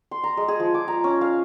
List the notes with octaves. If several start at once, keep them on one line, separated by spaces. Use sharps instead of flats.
C6
A#5
G#3
G#4
F3
D6
A#5
C#4
F5